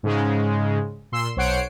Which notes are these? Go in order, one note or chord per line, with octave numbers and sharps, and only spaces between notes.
G#2 C#3 G#3
A#2 C6 E6
B1 C5 C#5 F#5 C7 D7